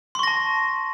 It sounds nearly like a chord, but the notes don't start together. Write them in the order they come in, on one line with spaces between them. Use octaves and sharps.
C6 C#6 A#6 A5